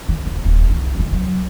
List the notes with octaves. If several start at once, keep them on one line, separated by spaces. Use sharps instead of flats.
D#3
D#1
D#1
C2 D#3
B2 D3
F#3